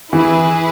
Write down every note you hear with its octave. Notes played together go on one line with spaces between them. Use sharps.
E3 E4 G#4 B4